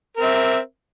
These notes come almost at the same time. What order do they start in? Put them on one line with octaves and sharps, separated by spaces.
A#4 C4 E5